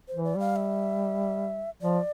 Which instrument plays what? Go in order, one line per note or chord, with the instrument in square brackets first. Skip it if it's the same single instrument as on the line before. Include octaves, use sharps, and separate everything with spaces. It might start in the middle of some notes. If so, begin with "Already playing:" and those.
[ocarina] C5
[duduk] E3
[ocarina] D5
[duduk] G3 [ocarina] F5
[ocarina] E5
[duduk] F3 [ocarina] D5